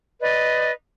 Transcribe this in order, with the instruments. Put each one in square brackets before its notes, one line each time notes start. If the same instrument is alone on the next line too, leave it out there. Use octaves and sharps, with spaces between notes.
[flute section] B4 D5 D#5